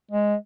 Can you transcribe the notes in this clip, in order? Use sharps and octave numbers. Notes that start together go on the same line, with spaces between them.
G#3